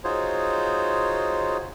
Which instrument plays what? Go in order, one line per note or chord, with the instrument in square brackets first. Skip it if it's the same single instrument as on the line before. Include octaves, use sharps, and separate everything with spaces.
[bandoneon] D#4 F4 F#4 G#4 C5 C#5